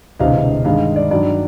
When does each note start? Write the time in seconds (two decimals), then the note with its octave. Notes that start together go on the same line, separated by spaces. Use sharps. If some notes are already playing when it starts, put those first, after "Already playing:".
0.19 E1 D2 C3 E3 D#5 F5
0.65 G2 D#3 G#3 D#5 F5
0.96 D5
1.10 G2 D#3 F#3 D5